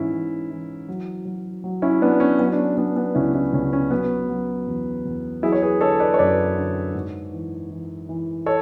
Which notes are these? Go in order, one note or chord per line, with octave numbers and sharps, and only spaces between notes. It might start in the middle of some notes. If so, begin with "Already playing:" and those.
Already playing: G#2 E3 C#4 E4
E3
E3
F#3
F#3
F#3
C#4 E4
F#3 B3 D4
C#4
F#3 B3
D4
C#4
F#3 B3 D4
B3 D4
C#2 C#4 E4
C#4 E4
C#2 C#4
C#4
F#3 B3
F#3
E2
E2
F#3 E4 G#4
C#5
G#4 B4
D3 A4 C#5
B4 D5
C#5
F#2 B4 D5
D3
G#2
E3
E3
E3
A4 C#5